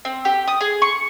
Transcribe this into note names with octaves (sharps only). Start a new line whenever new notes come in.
C4
G4
D#6
G#4
C#6